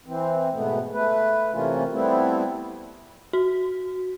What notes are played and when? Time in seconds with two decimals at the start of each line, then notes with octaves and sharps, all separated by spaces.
0.06 E3 C4
0.53 G#2 B2 A3 B3
0.93 A3 B4
1.52 C3 E3 A3 A#3 C#4 F4
1.92 G3 A3 B3 C4 E4
3.33 F#4